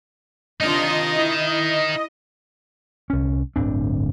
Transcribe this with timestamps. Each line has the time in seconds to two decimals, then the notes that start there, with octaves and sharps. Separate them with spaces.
0.60 C3 D4 D#4 F4 A#4 D#5
1.15 E4
3.10 C2 C#4
3.56 D1 G1 C4 D4